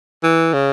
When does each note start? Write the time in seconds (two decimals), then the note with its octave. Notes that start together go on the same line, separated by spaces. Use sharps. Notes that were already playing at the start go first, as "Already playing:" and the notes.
0.23 E3
0.53 C#3